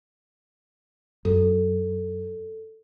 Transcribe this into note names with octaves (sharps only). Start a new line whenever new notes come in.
F#2 A4